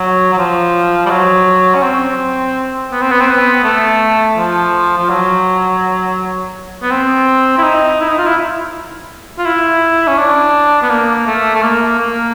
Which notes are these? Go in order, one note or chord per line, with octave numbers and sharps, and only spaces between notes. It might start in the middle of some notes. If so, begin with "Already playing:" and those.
Already playing: F#3
F#3
F3
G3
F#3
C#4
C4
B3
C4
B3
C4
B3
A3
F3
F3
F#3
B3
C4
E4
D#4
E4
D#4
F4
E4
F4
E4
C#4
D4
B3
A#3
A3
A3
A#3
A#3